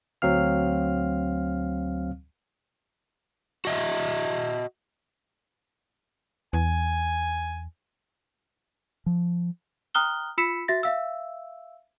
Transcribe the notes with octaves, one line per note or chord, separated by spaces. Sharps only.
D2 F#3 C4 F5 F6
F#4 D#5 E5
E2 G#5
F3
G5 A#5 D#6 F6 F#6 G7
F4 B5 E6 B6 C#7 E7
F#4 E5 A6 A#6
E5 F5 E6